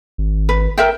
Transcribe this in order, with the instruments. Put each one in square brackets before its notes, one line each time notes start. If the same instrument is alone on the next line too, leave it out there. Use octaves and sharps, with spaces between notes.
[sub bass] G#1
[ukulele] B4
A#4 E5 G5